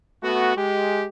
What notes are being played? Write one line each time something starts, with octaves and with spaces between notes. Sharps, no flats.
A3 B3 F#4
G#3 G4